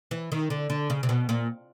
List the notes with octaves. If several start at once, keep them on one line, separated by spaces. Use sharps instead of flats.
E3
D#3
D3
D3
C#3
C3
B2
A#2